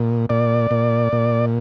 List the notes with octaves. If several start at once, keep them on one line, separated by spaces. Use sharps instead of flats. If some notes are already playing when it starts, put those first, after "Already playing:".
Already playing: A#2
A#2 D5
A#2
A#2